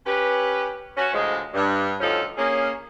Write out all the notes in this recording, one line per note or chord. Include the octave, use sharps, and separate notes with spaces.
C#4 G4 B4
C#4 F#4
D2 A2 F3 G#3
G2
D2 F3 C#4 D#4 F4 A4
A#3 C#4 G#4